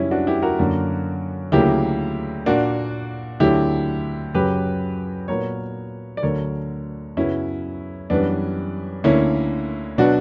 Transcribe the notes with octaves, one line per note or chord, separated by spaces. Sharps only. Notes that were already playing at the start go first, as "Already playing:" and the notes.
Already playing: F#2 C#3 G3 C#4 E4
D4 F#4
E4 G4
F#4 A#4
F#2 D3 A#3
D2 C#3 F#3 A#3 E4 G4
A#2 A#3 D4 F#4
D2 D3 F#3 E4 G4
F#2 C#3 F#3 G4 B4
A#2 F#3 B3 A#4 C#5
D5
D2 D3 F#3 A#4 C#5
F#2 C#3 F#3 B3 C#4 E4
F#2 E3 G3 B3 D4
D2 D3 A#3 C#4 E4
B2 F#3 B3 D4 F#4